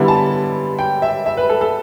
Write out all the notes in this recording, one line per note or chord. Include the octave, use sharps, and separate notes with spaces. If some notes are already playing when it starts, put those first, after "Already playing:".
Already playing: D3 G3 B3 E4
A5
G5
E5
E5
B4
A4
A4